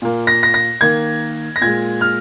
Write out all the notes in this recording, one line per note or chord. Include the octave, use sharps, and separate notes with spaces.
A#2 A#3
A#6
A#6
A#6
D#3 A#3 G#6
A#6
A#2 G#3 G#6
F6